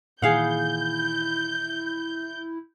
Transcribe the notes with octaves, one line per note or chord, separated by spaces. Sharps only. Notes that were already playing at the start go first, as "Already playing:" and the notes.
A#2 D#3 E3 E4 G#4 F5 F#5 G6